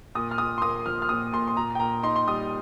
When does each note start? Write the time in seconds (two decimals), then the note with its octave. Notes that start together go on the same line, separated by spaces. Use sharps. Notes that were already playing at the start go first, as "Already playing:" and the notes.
0.15 A#2 D#6
0.31 F6
0.38 A#2 D#6
0.58 C6
0.62 A#3 D#6
0.86 F3 F6
1.02 F6
1.09 A#2 D#6
1.33 A#2 C6
1.47 C6
1.57 A#2 A#5
1.75 G5
1.80 A#2 A#5
2.03 D#4 C6
2.16 C6
2.27 G3 D#6